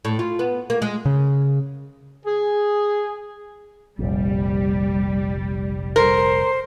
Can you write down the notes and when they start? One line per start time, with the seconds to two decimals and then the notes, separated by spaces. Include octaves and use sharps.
0.05 A2
0.19 F4
0.39 B3
0.70 A#3
0.82 G#3
1.05 C#3
2.26 G#4
3.99 F1 A#1 G3
5.96 A#4 C5